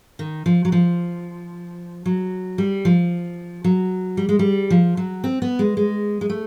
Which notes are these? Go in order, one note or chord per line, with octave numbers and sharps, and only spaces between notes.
D#3
F3
F#3
F3
F#3
G3
F3
F#3
G3
G#3
G3
F3
F#3
C4
B3
G#3
G#3
G#3
A3